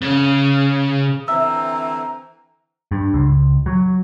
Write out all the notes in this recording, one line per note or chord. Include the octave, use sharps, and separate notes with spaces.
C#3
D3 E3 C4 E5 A#5 E6
G2
C#2
F#3